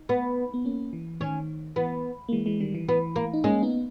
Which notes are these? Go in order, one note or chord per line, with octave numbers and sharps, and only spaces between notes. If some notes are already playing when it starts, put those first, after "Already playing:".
Already playing: D#4
B3
B3
A#3 C#4
E3
D#3 C#4
E3 B3
A#3
E3 G#3
E3 G#3
D#3 G3
E3
E3 B3
A#3
D#4
G#3 A#3 C#4
B3 D#4